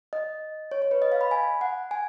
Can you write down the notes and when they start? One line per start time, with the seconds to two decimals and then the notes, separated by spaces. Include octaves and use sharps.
0.13 D#5
0.71 C#5
0.82 C#5
0.91 B4
1.02 D#5
1.12 F5
1.21 B5
1.31 G#5
1.61 F#5
1.91 G#5